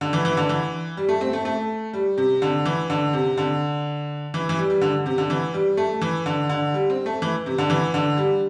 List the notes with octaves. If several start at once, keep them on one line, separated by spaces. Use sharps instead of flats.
D3
E3
E3
D3
E3
G3
A3
C4
A3
A3
G3
C3
D3
E3
D3
C3
D3
E3
E3
G3
G3
D3
C3
D3
E3
G3
A3
E3
D3
D3
G3
C4
A3
E3
C3
D3
E3
D3
G3